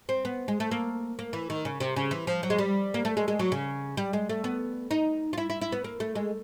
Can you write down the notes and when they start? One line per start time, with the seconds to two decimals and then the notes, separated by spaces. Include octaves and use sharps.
0.09 C4
0.25 B3
0.48 G#3
0.60 A3
0.71 A#3
1.19 A#3
1.33 E3
1.50 D#3
1.65 C#3
1.80 C3
1.96 C#3
2.11 E3
2.27 F3
2.43 F#3
2.50 G#3
2.58 G3
2.94 A#3
3.05 A3
3.17 G#3
3.28 G#3
3.39 F#3
3.52 C#3
3.97 G3
4.13 G#3
4.29 A3
4.44 B3
4.91 D#4
5.33 F4
5.38 E4
5.50 E4
5.61 E4
5.72 B3
5.84 A#3
6.00 A3
6.15 G#3